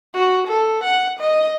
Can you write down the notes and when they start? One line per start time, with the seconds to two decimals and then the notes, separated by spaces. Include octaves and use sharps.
0.14 F#4
0.48 A4
0.84 F#5
1.19 D#5